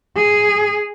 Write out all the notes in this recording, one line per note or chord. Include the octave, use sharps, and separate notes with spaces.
G#4